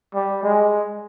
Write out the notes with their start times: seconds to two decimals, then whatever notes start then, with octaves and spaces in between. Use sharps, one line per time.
0.15 G3
0.43 G#3